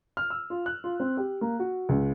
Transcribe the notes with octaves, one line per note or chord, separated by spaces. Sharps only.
F6
E6
F4
F#6
F4
C4
G4
A#3
F#4
C#2